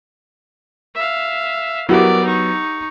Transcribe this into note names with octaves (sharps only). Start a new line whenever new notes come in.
E5 F5
F#3 B3 E4 F#4 G4 A#4 D5
D#4 C#6